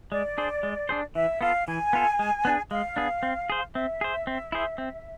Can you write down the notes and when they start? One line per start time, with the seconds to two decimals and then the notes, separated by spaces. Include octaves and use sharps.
0.11 G#3 D5
0.38 D4 G#4 C5
0.63 G#3
0.89 D4 G#4 C5
1.15 E3 E5
1.41 B3 F4 A4 F5
1.67 E3 G#5
1.93 B3 F4 A4
2.19 G#3
2.45 B3 D4 G#4
2.71 G#3 F5
2.96 B3 D4 G#4
3.23 C4
3.50 G#4 C5
3.75 C4 E5
4.01 G#4 C5
4.27 C4
4.52 E4 G#4 C5
4.78 C4